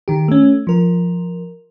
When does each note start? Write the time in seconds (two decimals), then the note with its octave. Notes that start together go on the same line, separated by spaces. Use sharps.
0.08 D#3 G4
0.28 A3 C#4
0.67 F3 A#4